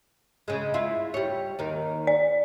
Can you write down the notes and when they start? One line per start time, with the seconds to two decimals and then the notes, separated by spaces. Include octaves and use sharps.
0.48 C#3 G#3
0.74 E4 F4
1.14 G3 C#5
1.59 D#2 D#3
2.07 D5